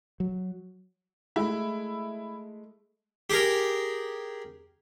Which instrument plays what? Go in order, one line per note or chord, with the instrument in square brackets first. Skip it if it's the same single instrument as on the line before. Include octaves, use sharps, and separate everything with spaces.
[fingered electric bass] F#3
[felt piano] G#3 A3 [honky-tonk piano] E4
[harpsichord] G4 G#4 A#4